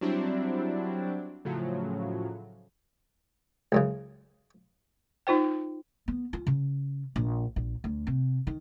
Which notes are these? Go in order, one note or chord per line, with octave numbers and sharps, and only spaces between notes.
F#3 G3 C4 D4 E4
A2 C#3 F3 F#3
C#2 F#2 C#3
D#4 F4 C5 G5
B3
F4
C#3
A#1
A#1
D2
C3
D#3